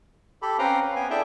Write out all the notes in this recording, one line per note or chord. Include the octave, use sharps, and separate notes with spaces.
G4 A4 B5
C4 C#4 B4 F5 G5 A#5
B4
B3 G5 G#5
D4 E4 G#4 A4 E5 G5